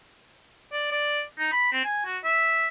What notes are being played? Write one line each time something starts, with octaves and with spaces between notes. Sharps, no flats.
D5
D5
D#4
B5
C4
G#5
F#4
E5